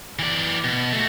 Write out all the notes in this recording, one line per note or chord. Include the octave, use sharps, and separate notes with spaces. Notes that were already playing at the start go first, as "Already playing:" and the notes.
E3 D5
B2
A3 F#4